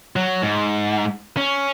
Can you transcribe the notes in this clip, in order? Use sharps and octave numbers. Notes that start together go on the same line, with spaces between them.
F#3
G#2
C#4